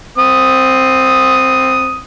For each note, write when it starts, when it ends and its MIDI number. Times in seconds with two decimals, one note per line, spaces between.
0.18 2.01 60
0.18 2.01 87